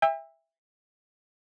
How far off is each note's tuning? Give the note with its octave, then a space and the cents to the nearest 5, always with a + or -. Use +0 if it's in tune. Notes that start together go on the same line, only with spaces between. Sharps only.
E5 +0 G5 +45